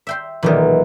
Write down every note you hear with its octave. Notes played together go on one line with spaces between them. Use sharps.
E5 G5 C6
B1 A#2 D#3 E3